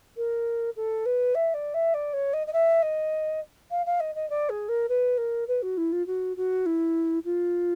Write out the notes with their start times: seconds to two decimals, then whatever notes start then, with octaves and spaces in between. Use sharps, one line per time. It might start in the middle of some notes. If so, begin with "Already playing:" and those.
0.17 A#4
0.76 A4
1.06 B4
1.35 E5
1.54 D5
1.74 E5
1.94 D5
2.13 C#5
2.33 D#5
2.47 D#5
2.53 E5
2.82 D#5
3.71 F5
3.86 F5
4.00 D#5
4.15 D#5
4.30 D5
4.49 G#4
4.69 A#4
4.89 B4
5.18 A#4
5.48 B4
5.62 F#4
5.77 E4
5.92 F4
6.07 F#4
6.37 F#4
6.66 E4
7.25 F4